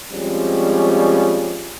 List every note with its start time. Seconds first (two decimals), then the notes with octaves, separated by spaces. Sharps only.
0.12 F3 G3 G#3 C4 C#4